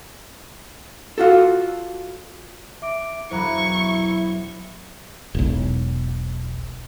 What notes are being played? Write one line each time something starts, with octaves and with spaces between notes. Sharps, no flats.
F4 F#4 A4
E5 D6 D7
E1 F#3 E4 C5 A#5 B5 C#6 F#6
E1 B1